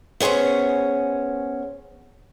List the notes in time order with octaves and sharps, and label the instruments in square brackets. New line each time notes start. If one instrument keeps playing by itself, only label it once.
[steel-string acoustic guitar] B3 C#4 G#4 C5 C#5